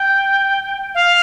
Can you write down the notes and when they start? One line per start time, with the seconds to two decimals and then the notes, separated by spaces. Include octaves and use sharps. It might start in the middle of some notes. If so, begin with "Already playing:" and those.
Already playing: G5
0.95 F5